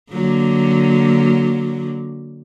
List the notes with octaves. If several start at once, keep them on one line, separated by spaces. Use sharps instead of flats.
D3 F#3 A#3